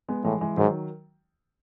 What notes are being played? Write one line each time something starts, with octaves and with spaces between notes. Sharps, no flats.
G#3 B3
A2 E3 G#3
E3 G#3
G#2 D#3 F#3